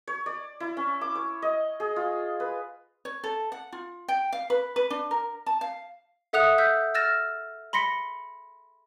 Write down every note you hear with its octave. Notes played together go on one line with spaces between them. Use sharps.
C#5
D5
E4
C#4
D6
C#5
D#5
G#4
F4
B4
C#5
A4
F#5
F4
G5
F5
B4
B4
D4
A#4
A5
F5
A4 E5 F#5 D#6 F#6 F7
E6 G6 B6
E6 F6 A6 A#6 E7
B5 C6 A#6 B6 C#7